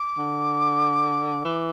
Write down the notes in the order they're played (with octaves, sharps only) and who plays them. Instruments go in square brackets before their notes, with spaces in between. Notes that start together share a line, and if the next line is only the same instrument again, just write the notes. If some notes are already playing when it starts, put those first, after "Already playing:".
Already playing: [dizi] D6
[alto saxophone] D3
E3